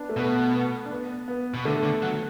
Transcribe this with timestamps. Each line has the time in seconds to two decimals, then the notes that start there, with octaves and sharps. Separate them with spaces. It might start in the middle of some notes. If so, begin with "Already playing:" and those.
Already playing: B3 D4
0.09 A3
0.16 B2 B3
0.54 B3
0.86 D4
0.91 B3
1.28 B3
1.54 B2
1.65 D3 A3
1.83 D3
2.02 F#3